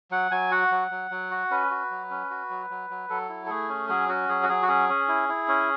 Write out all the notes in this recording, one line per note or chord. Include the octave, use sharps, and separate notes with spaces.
F#3 F#5
F#3 G#5
F#4 F#5
F#3
F#3
F#3
F#4
C#4 B4
F#4
F#3
C#4
F#4
F#3
F#3
F#3
F#3 A4
E4
A4
A3 G#4
C#4
F#3 G#4
C#4 F#4
F#3 G#4
F#4
F#3 G#4
F#4
C#4 G#4
C#4
E4
E4
C#4